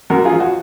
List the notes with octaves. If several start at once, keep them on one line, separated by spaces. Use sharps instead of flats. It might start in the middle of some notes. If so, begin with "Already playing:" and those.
F#2 F#4 A#4
F4 G#4
F3
F#4